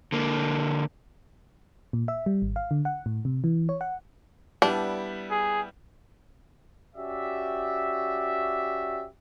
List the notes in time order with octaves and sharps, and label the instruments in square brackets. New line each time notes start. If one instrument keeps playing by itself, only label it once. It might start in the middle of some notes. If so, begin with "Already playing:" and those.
[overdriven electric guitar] D3 A#3
[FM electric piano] A#2
E5
G3
G#1
F5
D3
F#5
A2
C3
E3
C#5
F#5
[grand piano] G3 B3 E4 [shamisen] D4
[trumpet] G#4
[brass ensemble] C#4 F#4 G4 D5 E5